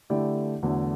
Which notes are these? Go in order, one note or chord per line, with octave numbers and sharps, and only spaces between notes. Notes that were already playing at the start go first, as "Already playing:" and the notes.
D3 A3 E4 G4 D5
E2 D3 F#3 A3